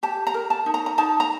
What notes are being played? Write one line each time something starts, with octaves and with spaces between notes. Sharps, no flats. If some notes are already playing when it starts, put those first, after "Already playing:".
G4 A5
A#5
A#4
A5
D#4
A#5
A#5
D#4 A5
A#5